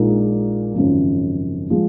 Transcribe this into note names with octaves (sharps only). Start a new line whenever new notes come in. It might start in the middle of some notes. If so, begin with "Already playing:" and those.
Already playing: A#1 A#2 G#3 D#4
G#1 F#2 C#3 F3
F3 G#3